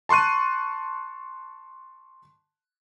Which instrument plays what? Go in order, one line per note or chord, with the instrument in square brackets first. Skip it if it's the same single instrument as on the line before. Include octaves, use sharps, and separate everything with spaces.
[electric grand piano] A5 C6 C#6 F#6 D#7